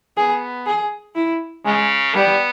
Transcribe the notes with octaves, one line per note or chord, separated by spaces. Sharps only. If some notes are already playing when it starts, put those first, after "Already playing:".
B3 G#4
G#4
E4
C#3 G#3
G3 B3